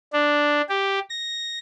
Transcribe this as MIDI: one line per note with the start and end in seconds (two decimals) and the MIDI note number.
0.13 0.62 62
0.69 0.99 67
1.10 1.59 94